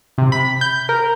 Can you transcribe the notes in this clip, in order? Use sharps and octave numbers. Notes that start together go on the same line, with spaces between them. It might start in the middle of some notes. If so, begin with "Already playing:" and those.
C3
B5
G6
A#4